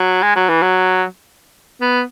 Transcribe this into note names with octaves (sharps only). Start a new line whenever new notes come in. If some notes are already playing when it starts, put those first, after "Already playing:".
Already playing: F#3
G#3
F#3
E3
F#3
B3